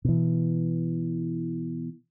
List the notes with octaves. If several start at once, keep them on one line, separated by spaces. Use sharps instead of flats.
B2 E3